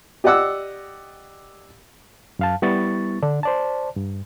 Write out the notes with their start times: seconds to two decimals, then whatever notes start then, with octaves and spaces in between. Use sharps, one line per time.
0.24 G4 D5 D#5 F#5 D6 E6
2.39 F#2 F5 A5
2.62 G3 B3 E4 C#6 A6
3.23 D3 D4
3.43 C5 D5 A5
3.96 G2